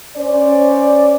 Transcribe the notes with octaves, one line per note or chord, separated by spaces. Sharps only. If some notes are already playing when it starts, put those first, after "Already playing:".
C#4 C5 D5